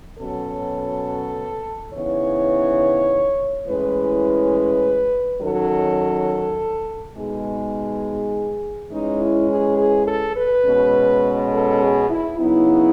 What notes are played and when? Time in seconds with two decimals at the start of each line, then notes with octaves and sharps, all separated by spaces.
0.18 B2 F#3 C#4 A4
1.93 C#3 E3 B3 D#4 C#5
3.67 A2 E3 G#3 C#4 B4
5.41 D#3 F#3 C#4 A4
7.15 B2 G#3 D#4 G#4
8.90 E3 G#3 C#4 D#4
9.19 E4
9.48 G#4
9.77 G#4
10.06 A4
10.35 B4
10.64 B2 G#3 C#4
11.51 A4
11.80 G#4
12.10 E4
12.39 C#3 F#3 B3 D#4 E4